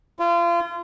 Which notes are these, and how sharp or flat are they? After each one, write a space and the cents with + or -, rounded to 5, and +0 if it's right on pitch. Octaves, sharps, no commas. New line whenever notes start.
F4 -30